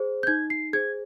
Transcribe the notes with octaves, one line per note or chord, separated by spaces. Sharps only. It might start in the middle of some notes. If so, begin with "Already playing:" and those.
Already playing: G#4 C5
G6
D#4 G#6
C7
G#4 C5 G#6